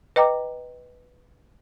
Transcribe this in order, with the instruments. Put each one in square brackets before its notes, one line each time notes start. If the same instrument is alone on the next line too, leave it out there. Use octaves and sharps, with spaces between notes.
[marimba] B4 D#5 G5 A#5 D6